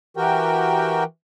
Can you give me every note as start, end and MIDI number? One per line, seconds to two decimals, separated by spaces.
0.17 1.04 52
0.17 1.04 66
0.17 1.04 67
0.17 1.04 70
0.17 1.04 79